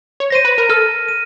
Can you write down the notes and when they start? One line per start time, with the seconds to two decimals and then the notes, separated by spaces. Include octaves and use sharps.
0.20 C#5
0.30 C5 A#6 D#7
0.45 B4
0.58 A#4
0.69 A4 F6
1.08 D#7